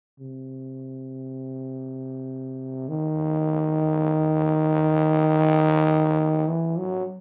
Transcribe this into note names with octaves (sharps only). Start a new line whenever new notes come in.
C3
D#3
E3
F#3